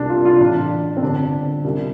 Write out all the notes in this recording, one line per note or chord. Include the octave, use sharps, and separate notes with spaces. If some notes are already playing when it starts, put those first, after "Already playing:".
Already playing: C2 C3 D4
F4
F4
A1 A2 D4
C4
G1 G2 D3 D4
C2 C3